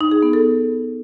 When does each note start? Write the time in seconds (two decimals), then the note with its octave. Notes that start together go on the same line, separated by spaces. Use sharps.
0.01 D#4
0.12 G#4
0.22 B3
0.33 A4